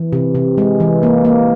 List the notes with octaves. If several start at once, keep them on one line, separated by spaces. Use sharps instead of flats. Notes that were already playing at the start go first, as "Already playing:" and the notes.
Already playing: E3
C3
C3
G#3
E3
A#3
A#3